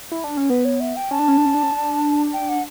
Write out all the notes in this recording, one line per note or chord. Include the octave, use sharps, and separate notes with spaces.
E4
D4
C#4
B3 B4
C#5
E5
G5
C#4 A5
D4
C#4
D4
C#4
D4
C#4
D4
G5
F#5